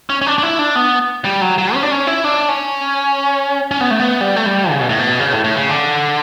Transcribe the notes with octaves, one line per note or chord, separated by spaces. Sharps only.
C#4
C#4
D4
D4
E4
D4
B3
G3
F#3
F#3
C#4
D4
C#4
E4
D4
C#4
C#4
B3
A3
B3
G3
A3
G3
C#3
B2
A2
B2
C#3
A2
A2
C#3
D3